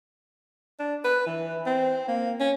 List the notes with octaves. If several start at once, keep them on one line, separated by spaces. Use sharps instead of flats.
D4
B4
E3
C4
A#3
C#4